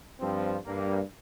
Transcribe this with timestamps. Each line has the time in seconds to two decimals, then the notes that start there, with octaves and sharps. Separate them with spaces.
0.20 G2 F3 C4
0.65 G2 G3 A#3